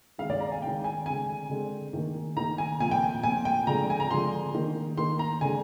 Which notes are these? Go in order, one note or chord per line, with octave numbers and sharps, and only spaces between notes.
D#3 G#3 C4 F5
D5
A#5
G#5
D#3 G#3 C4 G5
G#5
D3 G#3 C4 G#5
D3 G#3 C4
D#3 A#3
D#3 A#3 A#5
G#5
A#2 F3 C4 G#5
G5
G#5
A#2 F3 C4 G#5
G5
D3 F3 G#3 C4 A#5
G#5
A#5
D3 F3 G#3 C4 C6
D#3 A#3
D#3 A#3 C6
A#5
D3 G#3 C4 G#5